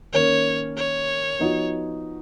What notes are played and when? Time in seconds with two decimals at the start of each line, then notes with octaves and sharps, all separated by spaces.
0.13 D#3 A#3 C#4 C#5
0.77 C#5
1.39 F3 B3 D#4 F#4